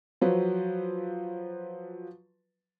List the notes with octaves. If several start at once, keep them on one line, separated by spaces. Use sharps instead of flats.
F3 F#3 B4